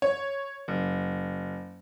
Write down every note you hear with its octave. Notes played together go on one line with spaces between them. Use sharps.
C#5
F#1